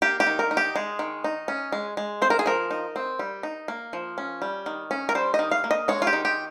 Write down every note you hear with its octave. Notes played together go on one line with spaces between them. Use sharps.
A#3 G4
G4
D#3
A#4
D#4
G4
G#3
D#3
D#4
C#4
G#3
G#3
C4 C5
A#4
G#4
F3 A#4
D#4
C4
G3
D#4
A#3
F3
C#4
G3
D#3
C#4
A#4
G3 C5
D#5
D#3
F5
A#3
D#5
G#3 C#5
F4
G4
D#3
G4